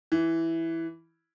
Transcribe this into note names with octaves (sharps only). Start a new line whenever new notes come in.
E3